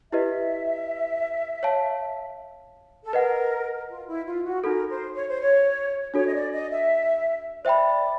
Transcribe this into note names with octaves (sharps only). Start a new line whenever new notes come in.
E4 G4 B4 D#5 E5
C#5 F5 A5
A4
A#4 B4 D#5 F#5
F4
E4
F4
F#4
D#4 F#4 A4 A#4
C5
C#5
C5
C#5
D4 F#4 A4 C#5
D#5
D5
D#5
E5
C5 D5 E5 G5 B5